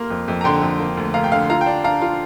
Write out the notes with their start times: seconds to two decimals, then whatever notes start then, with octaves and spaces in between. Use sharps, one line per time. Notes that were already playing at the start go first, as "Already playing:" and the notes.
Already playing: A#3 C6 F6
0.10 F2
0.28 F2
0.41 A#5
0.44 D3 G5 C6
0.62 F2
0.79 A#3
0.97 D2
1.14 D2 F5 A#5
1.24 G5
1.32 D3 F5
1.50 F4 F5 A#5
1.61 G5
1.66 D4
1.84 D4 F5 A#5
2.02 F4